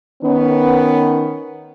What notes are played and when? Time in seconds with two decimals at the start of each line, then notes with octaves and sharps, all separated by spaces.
0.23 D#3 B3 C#4